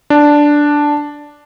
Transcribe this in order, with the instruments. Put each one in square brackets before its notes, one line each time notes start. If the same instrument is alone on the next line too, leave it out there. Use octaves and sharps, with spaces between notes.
[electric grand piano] D4